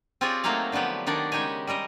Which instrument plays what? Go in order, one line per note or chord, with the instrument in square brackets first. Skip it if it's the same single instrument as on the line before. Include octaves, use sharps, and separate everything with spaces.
[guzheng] C4 F4 G4 G#4 C#5 D5
F#3 A3 A#3 D#4 G#4 F5
D3 F3 F#3 B3 G4
D#3 D4 D#4 C#5 D5
C#3 G#3 D#4 G4 C#5 G#5
G3 G#3 A#4 D#5